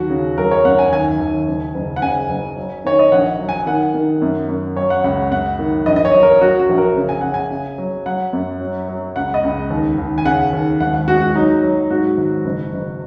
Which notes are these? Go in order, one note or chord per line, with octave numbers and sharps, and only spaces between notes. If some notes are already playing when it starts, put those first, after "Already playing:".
Already playing: D#2 F#3 F#4
C#3
F#3 A#4
C#5
F#2 F#5
G#5
D#2 G#5
D#2
F#1
F#1
F#5
C#3 G#5
F#1
F#3
D#3 C#5
D#5
A#1 F#5
F#3
G#5
D#3 F#5
D#3
F#2
F#2
F#3 C#5
F#5
C#2 F#5
F#2 F#5
D#3
A#1 D#5
D#5
C#5
F#3
A#4
F#3 F#4
F#4
A#1
A#4
C#3
G#5
C#3 F#5
G#5
C#3
F#3
F#3 F#5
F#2
F#3
F#3
C#2 F#5
D#5
C#2
D#2
D#2
G#5
C#3 F#5
D#2
G#1 F#5
F#5
G#3 F#4
F#4
F#3 D#4
F#3
G#2 F#4
G#1
F#1
F#1